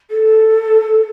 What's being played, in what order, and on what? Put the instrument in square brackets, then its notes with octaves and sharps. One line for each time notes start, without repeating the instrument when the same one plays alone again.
[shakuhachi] A4